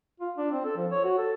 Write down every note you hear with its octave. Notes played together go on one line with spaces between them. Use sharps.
F4
D4
C4
A4
F3
C#5
F#4
A4